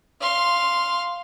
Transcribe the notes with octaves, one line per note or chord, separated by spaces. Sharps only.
F5 C6